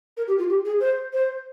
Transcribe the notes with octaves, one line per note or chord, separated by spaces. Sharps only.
A#4
G4
F4
G4
G#4
C5
C5